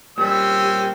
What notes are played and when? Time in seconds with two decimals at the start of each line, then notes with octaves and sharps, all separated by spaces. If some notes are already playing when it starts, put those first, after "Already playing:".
0.18 A#2 G3 C4 C#4 G4 E6